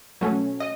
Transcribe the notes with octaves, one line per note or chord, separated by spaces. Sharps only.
B2 F#3 A3 C#4
D#5